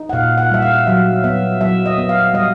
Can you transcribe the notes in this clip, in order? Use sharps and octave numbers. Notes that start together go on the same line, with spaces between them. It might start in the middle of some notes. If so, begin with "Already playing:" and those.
Already playing: D#4
F#5
A#2 F5
F#5
G3 E5
F5
F#3 E5
B3 E5
F#3 E5
D#5
B3
F5
G3 D#5